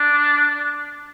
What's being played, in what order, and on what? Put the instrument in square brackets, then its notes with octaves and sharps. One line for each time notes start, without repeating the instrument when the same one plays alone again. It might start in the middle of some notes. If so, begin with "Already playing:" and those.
Already playing: [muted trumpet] D4